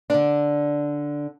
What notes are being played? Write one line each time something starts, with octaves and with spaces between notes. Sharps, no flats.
D3 D4